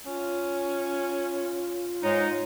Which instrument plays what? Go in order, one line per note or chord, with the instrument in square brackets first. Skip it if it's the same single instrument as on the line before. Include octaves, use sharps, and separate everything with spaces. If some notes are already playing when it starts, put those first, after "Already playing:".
[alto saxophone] C#4 [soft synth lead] F4
[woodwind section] G#2 G#3 D#4 [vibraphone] C#5